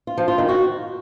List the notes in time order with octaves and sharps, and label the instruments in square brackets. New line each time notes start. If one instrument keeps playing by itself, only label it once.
[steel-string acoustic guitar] F4
F3
F4
D#3
F#4